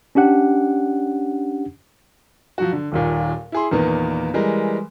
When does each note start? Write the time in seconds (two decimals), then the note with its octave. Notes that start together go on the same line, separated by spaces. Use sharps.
0.15 C#4 D4 G4 F#5
2.58 F3 F#3 F#4
2.73 D3
2.92 D#1 D#2 A#2
3.52 E4 G#4 C6
3.71 E2 A#2 D#3 A#3 B3
4.34 E3 G3 G#3 A#4